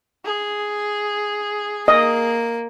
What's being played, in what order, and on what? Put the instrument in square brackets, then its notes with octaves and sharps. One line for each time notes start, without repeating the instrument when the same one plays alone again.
[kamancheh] G#4
[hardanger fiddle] A#3 [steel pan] D#5